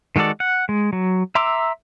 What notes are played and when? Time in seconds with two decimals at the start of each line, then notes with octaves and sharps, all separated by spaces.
0.16 D#3 G#3 F#4 A4 D5
0.40 F#5
0.69 G#3
0.93 F#3
1.35 E5 A#5 C6 D6 E6